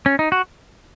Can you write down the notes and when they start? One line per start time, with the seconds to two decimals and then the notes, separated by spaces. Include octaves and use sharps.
0.06 C#4
0.19 D#4
0.32 F#4